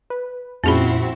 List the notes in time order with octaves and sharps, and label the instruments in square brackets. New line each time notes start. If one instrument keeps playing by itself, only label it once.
[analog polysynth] B4
[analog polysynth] F2 A#2 [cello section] C4 E4 F#4 [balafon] C#4 G#4 B5